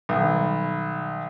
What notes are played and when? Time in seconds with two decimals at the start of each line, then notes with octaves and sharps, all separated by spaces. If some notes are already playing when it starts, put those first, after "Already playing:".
0.09 B1 D#3 F#3 G3